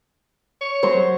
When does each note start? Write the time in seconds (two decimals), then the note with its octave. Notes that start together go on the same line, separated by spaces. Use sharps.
0.61 C#5
0.83 F#3 C5